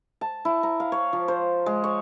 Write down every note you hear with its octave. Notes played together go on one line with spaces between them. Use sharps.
A5
E4
A#5
F5
C#5
F3
C5
G#3
C#5